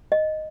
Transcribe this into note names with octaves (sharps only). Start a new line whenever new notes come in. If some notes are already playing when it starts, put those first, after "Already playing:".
D#5